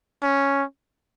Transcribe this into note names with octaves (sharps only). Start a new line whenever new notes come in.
C#4